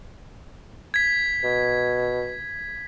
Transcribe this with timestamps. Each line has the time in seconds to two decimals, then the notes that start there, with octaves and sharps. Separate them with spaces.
0.94 G#6 B6
1.44 B2